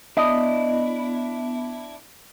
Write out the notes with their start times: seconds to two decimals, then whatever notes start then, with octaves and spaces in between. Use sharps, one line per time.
0.17 B3 D4 E4 D#5